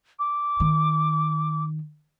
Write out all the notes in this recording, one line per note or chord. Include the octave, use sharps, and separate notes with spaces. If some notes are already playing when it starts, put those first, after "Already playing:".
D6
D#3